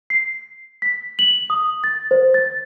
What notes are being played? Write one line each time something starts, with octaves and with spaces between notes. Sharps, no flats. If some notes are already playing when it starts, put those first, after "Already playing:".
C7
B6
F#7
D#6
A6
C5
A6